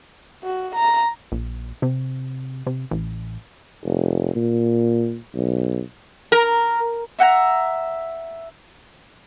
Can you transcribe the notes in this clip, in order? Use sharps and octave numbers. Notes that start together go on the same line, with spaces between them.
F#4
A#5
A#1
C3
C3
A1
F1
A#2
B1
A#4
E5 F#5 G5 A#5